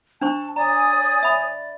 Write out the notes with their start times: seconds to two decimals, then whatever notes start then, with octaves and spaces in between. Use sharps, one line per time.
0.22 D4 C5 A5 C#6
0.56 C#5 D5 G#5 A#5 D#6
1.23 E5 B5